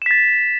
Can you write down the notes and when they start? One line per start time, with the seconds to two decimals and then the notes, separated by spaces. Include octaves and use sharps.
0.02 E7
0.06 B6
0.11 A6